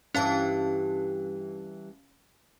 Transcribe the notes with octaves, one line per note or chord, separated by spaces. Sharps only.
G2 E3 C#4 F5 A5